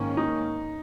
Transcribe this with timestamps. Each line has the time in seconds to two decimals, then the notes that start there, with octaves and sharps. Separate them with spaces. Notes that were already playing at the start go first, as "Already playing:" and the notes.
Already playing: G#2 D#3 A#3 C#4
0.17 D#4